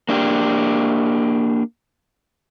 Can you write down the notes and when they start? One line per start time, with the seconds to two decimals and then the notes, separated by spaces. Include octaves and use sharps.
0.09 A#3 D4 G4